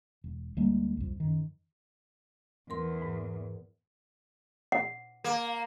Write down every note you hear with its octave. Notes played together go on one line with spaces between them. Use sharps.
E1
D2 G3 G#3 A#3
C2 F2
F#2 D#3
E2 A#4 C6
G#2
F#5
A#3